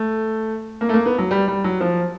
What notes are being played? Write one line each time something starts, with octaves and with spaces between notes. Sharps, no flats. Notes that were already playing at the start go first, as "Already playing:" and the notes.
Already playing: A3
A#3
A3
A#3
B3
F#3
G3
G3
F#3
F3